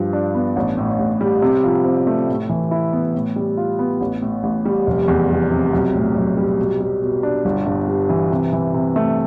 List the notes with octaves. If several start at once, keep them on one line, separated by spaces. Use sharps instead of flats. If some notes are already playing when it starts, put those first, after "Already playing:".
Already playing: G2 F3
D4
B3
A1
A2
A1
G3
C3
F3
C4
A3
A2
E3
E4
B3
A2
G3
F4
B3
A1
A2
A1
G3
F1
E2
G3
C3
B1
A2
B1
G3
B2
G3
B2
D4
G1
G2
G3
E3
C3
E3
C3
A3